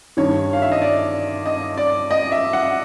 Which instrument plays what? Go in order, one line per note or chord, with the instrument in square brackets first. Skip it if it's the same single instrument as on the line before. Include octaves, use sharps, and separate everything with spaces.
[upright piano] G2 D#3 C#5
F5
E5
D#5
D5
D#5
D5
D#5
E5
F#5